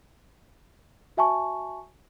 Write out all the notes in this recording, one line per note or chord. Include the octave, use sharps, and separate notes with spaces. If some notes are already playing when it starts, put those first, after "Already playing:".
F#4 E5 G#5 A5 C#6